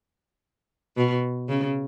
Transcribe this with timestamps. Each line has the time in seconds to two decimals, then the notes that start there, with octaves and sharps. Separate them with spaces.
0.97 B2
1.49 C#3